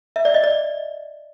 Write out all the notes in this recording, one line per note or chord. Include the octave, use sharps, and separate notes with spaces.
E5
D5
D#5
D5